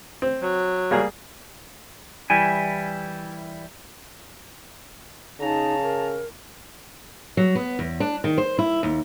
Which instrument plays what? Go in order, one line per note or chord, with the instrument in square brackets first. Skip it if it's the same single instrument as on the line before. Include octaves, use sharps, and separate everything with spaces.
[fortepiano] C4
[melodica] F#3
[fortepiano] G3 A#3 G#4
[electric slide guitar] E3 G3 E4 G#5
[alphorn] C#3 [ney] D#4 [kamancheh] A5 A#5
[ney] A#4
[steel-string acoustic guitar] F#3
B3
E2
D4
D#3
C5
E4
D#2